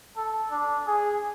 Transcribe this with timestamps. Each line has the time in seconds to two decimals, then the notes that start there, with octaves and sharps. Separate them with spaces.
0.17 A4
0.51 D4
0.87 G#4